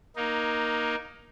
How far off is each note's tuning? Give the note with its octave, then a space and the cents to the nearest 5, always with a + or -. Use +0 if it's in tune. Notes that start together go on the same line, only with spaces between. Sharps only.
A#3 +15 D#4 +0